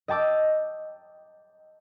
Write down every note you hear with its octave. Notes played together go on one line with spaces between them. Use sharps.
D#5 G5 A5 D6 E6